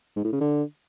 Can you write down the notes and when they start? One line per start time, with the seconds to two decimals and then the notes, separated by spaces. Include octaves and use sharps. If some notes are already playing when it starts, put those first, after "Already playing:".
0.16 G#2
0.24 A2
0.32 C#3
0.41 D3